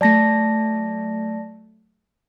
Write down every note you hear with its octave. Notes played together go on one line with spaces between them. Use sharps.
F#3 A3 D5 A5 A#6